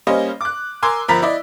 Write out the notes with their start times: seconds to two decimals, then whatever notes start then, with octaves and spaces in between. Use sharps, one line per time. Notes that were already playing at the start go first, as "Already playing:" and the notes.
0.07 G3 A#3 C#4 C5 D#5
0.41 D6 F#6
0.82 A#4 G#5 C6 D6 E6
1.08 G1 F3 A#4 A#5 B5 B6
1.22 E4 D5 D#5